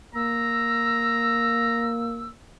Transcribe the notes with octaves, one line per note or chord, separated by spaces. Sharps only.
A#3 A#5 E6